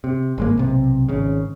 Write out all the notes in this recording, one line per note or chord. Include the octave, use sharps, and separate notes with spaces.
C3
G#1 G#3 A#3
B1 C3
G#1 C#3